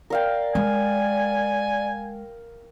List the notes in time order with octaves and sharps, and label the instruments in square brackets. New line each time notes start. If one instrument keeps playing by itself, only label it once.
[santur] A#4 F5 G5 [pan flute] D5
[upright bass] G#3 [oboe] G#5